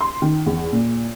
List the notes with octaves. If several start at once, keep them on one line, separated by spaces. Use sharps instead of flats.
C6
D#3
E2
A#2